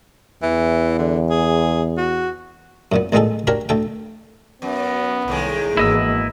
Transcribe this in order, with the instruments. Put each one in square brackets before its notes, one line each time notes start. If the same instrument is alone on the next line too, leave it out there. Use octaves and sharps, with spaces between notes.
[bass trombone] E2 [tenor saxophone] E3
[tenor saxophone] D3
G#4
F#4
[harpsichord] F#2 A#2 B3
A1 A#2 G#3 B3 G#4 A4
D4 F#4 G4 A#4 C#5
D2 A4 G5
[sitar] F#2 [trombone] B3
[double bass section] C2 [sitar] A2 D#3 G#3
[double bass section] G#1 E3 A#3 [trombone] B2 [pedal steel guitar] E4 D#5 E6